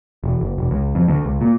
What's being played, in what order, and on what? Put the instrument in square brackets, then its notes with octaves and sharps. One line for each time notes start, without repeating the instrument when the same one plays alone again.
[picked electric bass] E1
F#1
E1
C#2
F2
D2
C#2
A#2